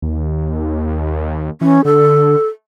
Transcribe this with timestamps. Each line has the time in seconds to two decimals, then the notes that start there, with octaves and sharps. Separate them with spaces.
0.02 D#2
1.61 E3 C#4
1.85 D3 A4